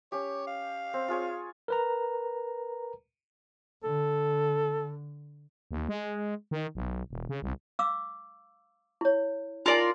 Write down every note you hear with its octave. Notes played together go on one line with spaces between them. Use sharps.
C#4 G4 C#5
F5
C4
F4 G#4 C#5
A#4 B4 A#5
D3 A4
D#2
G#3
D#3
B1
E1
C#3
C2
F5 D6 E6
E4 C#5
D#4 F4 A#4 D5 G#5